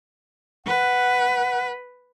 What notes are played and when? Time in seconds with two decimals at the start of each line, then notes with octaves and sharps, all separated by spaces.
0.67 B4 F#5